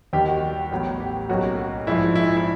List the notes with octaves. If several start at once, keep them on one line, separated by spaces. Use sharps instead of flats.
D#2 D#3 G3 G4
F#4
A1 A2 F#3 B3
G4
B1 A2 F#3 A#3 C#4 F#4
A#1 G#2 F3 E4
E4
E4